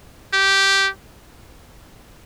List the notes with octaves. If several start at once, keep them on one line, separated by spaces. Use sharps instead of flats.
G4